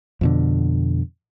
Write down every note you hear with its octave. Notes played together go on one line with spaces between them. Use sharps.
F2 B2 D3